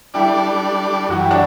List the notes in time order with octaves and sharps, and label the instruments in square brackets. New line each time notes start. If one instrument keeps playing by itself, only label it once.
[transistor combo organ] G3 D4 A4 D5 [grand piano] E4 G4
[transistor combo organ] F#2 E3 G3 [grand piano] F#4
[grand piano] G4
D4 F#4